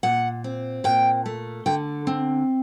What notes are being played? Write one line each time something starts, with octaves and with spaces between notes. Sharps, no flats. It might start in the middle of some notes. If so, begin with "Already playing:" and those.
A#2 F#5
C4
A#2 G5
A3
D3 G5
C4